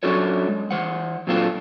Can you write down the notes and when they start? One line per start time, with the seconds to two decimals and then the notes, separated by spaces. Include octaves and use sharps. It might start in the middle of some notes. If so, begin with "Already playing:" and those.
0.03 F#3 C#4 D4 F#4 A4 C#5
0.49 G#3
0.71 E3 C5 F#5
1.27 A#2 F#3 C4 D4 F4 A4